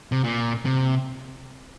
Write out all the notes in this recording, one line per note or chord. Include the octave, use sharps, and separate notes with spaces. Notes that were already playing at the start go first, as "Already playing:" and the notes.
C3
A#2
C3